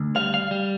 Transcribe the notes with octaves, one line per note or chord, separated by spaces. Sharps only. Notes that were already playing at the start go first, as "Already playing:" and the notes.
Already playing: D2
G3 F5
F5
G3